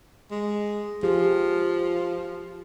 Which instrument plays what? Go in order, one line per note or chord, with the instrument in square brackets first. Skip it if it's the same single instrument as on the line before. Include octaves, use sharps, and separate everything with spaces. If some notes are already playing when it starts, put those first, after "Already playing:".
[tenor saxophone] G#3
[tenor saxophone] F3 [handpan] G4 G#4